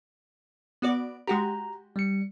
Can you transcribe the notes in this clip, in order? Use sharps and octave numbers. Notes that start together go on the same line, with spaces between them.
B3 F#4 D5
G#3 F#4 G4 A#5
G3 C#7